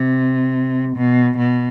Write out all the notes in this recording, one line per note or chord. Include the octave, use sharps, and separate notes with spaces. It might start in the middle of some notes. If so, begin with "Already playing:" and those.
Already playing: C3
B2
B2